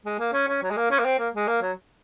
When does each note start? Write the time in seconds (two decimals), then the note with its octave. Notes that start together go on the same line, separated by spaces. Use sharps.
0.06 G#3
0.19 A#3
0.33 C#4
0.48 C#4
0.63 F#3
0.71 G#3
0.77 A#3
0.91 C#4
0.99 A#3
1.05 C4
1.19 A#3
1.35 G#3
1.48 A#3
1.62 F#3